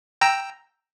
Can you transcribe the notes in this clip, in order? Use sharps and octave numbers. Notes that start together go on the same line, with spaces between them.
G5 A#5 E6